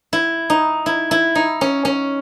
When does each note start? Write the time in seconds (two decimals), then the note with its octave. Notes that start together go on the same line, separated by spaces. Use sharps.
0.13 E4
0.50 D#4
0.86 E4
1.11 E4
1.35 D#4
1.61 C#4
1.85 C#4